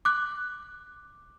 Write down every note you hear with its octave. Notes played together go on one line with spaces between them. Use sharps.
D6 F#6